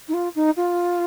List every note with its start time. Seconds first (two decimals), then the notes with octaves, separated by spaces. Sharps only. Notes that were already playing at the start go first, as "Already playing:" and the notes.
0.08 D#4
0.13 F4
0.35 D#4
0.57 F4